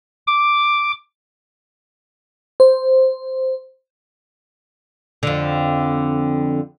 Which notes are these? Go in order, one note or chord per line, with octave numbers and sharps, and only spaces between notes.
D6
C5
F2 D3